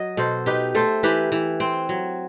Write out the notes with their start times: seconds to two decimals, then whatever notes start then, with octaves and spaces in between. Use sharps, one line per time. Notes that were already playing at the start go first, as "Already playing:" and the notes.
Already playing: F#3 D#5
0.17 B2 A4 C5
0.46 D#4 G4 B4
0.75 A3 A4 C5
1.03 E3 G4 B4
1.32 E3
1.60 C4
1.89 F#3